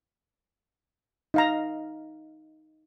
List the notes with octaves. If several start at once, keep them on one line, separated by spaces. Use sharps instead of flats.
D#4 F5 A#5